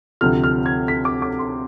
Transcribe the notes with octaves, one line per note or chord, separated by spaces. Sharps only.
D2 C3 F3 F6
F6
G#6
B6
D6
D6
C6